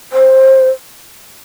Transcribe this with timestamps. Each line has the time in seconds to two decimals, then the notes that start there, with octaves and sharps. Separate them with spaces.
0.13 C5